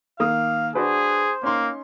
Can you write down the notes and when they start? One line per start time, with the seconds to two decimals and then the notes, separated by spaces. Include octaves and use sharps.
0.20 D#3 A#3 F5 D#6
0.75 D4 F#4 G#4 B4 C5
1.43 A#3 C#4 D#4 C6